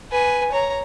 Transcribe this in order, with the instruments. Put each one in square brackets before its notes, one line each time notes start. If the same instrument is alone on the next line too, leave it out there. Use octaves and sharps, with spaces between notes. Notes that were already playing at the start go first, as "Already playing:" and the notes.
[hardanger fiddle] B4 G#5
C#5 A#5